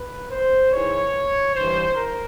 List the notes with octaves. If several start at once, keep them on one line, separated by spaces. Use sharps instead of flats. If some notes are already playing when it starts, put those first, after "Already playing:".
Already playing: B4
C5
G#2 E3 C#5
G2 E3 C5
A#4